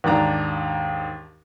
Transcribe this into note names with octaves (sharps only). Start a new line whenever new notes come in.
D#2 G#2 D4 A#5